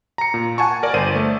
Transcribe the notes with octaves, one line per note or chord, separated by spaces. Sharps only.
A#5 C#7
A#2
F#5 G#5 A5 C#6
A#4 D5
G1 C5 D5 D#7
A3